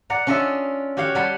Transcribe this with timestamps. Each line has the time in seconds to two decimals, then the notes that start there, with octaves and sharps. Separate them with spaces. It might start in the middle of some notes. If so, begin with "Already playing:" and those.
0.10 D5 F#5 A#5
0.27 C#4 D4 F4 D#5 E5
0.97 F#4 G4 C#5 F5 F#5
1.15 G3 G4 F#5 A5 B5 C6